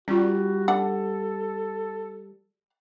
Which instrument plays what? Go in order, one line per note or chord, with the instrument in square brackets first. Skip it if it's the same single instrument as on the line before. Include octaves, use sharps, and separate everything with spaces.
[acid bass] G3 [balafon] C#4 F4 [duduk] F#4
[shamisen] D4 F#5 [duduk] A4